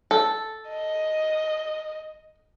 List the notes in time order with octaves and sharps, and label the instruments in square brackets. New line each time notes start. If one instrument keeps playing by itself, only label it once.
[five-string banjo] A4
[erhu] D#5